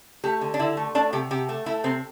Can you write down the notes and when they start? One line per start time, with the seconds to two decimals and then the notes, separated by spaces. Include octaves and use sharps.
0.24 A3 G4
0.41 D3
0.54 D4
0.59 D3 E4
0.77 A3
0.95 A3 D4
1.13 C3 G4
1.31 C3 G4
1.49 A3
1.66 A3 E4
1.84 C3 C4